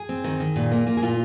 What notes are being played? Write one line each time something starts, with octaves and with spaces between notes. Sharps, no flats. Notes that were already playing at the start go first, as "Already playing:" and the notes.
Already playing: G#4
C4
D#3
D#3
A#2
A#3
A#3 F4
G#4
A#2 F4